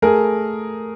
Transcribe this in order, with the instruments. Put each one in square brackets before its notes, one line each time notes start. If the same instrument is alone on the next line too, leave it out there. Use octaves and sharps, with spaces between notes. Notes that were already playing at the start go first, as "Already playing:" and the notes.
[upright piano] A3 G#4 A#4